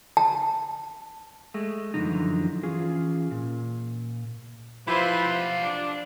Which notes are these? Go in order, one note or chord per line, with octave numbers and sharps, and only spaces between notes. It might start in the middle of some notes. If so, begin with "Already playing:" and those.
A5
G#3 A3
F#2 A#2 D3 E3 F3 D#4
E3 C#4 F4 G#4
A#2
F3 E4 F4 G4 B4 C5
D4